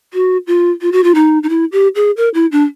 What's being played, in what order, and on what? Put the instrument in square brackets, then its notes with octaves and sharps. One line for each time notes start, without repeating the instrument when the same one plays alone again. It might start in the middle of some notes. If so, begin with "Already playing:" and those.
[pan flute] F#4
F4
F4
F#4
F4
D#4
D#4
E4
G4
G#4
A#4
E4
D4